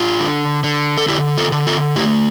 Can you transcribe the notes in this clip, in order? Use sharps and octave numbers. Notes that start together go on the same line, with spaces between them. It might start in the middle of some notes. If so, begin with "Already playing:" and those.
Already playing: D4 F4
D3
D3
A4
D3 E4 G4
F4 A4
D3
F4 A4
A3 E4 G4